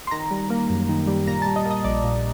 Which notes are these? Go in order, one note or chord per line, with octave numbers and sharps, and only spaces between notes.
C6
D#3 A#5
G3
A#3
F#2
D#3
G3
A#2 A#5
G3 A5
D#5
A#3
D#5
A#1 D5
A#2